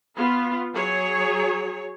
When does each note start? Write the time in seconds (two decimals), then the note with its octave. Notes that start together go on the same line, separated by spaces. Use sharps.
0.15 B3 F4
0.74 F#3 G#4 C#5